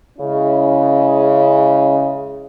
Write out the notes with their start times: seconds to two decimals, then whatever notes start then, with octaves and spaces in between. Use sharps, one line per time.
0.18 C#3 G#3 C#4 E4